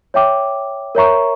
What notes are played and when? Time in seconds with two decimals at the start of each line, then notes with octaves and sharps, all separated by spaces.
0.14 C#5 E5 G5 D6
0.95 A#4 C#5 E5 A#5 C#6